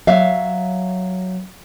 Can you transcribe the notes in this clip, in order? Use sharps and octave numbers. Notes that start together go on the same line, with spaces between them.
F#3 E5 F5